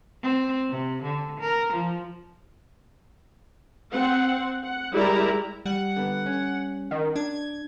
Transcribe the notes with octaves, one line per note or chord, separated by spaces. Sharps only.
C4
C3
D3
A#4
F3
C4 F#5
F#5
G3 G#3 E4 A#4 D5 A#5
G3 F#5
D3 B3
C#4
D#3
D4 G#6